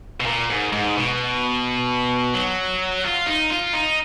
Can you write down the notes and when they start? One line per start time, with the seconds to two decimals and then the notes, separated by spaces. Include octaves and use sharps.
0.20 B2
0.26 A#2
0.49 G#2
0.72 G#2
0.96 B2
2.34 F#3
3.04 F4
3.27 D#4
3.50 F4
3.73 D#4